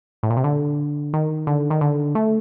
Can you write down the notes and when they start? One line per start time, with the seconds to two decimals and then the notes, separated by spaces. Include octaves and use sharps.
0.23 A2
0.30 A#2
0.37 C3
0.44 D3
1.14 D#3
1.47 D3
1.70 D#3
1.81 D3
2.15 A3